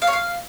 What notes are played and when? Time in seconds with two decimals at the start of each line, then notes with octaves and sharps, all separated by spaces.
0.02 F5
0.07 C#5
0.13 F5